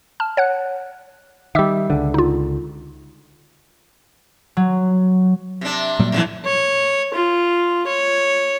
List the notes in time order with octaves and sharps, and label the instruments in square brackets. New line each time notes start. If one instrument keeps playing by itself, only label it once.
[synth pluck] A5 F6
C#5 F#5 F#6
[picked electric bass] D#3 G3 [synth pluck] E5 D6 E6
[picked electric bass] C#2 D3
[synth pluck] D#4 F4
[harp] F#3
[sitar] C3 D4
[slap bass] A#2 F#3 G3
[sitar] F2 D3 E3
[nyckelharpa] C#5
F4
C#5